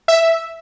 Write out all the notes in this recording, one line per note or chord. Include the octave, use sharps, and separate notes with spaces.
E5